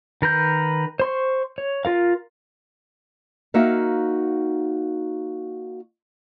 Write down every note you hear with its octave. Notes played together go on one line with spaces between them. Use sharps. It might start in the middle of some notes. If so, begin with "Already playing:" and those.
D#3 A#4 B4 G6
C5 C6 C#6
C#5
F4 A#4 F5
A#3 D#4 F#4 E5 F5